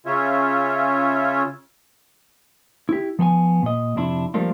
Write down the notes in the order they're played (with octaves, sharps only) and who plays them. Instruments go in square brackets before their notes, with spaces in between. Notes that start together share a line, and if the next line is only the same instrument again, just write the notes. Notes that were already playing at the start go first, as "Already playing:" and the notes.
[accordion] C#3 C#4 F4 C#5 E5
[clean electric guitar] E4 G4
F3 B3 G5 G#5
A#2 D#5
F2 C3 D4 E4
F3 G3 A3 A#3 D4 F4